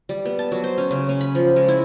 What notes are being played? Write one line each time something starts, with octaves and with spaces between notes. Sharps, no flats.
G3
B3
A5
F#3
C5
C#4
C#3
C#4
B5
F3
G#3
E4